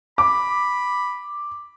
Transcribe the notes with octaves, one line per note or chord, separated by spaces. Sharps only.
B5 D6